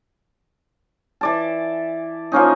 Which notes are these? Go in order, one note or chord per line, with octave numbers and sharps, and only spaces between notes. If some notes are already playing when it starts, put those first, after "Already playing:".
E3 D5 A5
F3 A#3 C#4 D#4